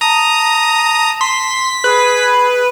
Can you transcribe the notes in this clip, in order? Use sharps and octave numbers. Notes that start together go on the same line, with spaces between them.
A5 A#5 D#6
C6 B6
G#4 B4